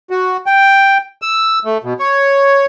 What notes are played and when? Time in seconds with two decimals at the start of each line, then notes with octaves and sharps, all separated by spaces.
0.10 F#4
0.46 G5
1.22 E6
1.65 A3
1.84 B2
1.99 C#5